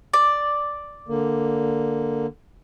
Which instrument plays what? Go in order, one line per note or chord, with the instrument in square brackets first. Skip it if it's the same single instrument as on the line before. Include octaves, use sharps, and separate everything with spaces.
[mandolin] D5
[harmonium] D3 A#3